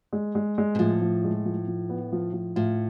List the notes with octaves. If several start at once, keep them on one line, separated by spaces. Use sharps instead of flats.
G#3
G#3
G#3
B2
A2 F3
F3
G#3
F3
F3
B3
F3
F3
A2 F4